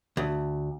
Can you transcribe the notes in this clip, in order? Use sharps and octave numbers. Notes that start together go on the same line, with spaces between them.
D2